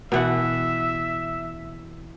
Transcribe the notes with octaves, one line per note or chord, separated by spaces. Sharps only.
B2 E3 E5 F#5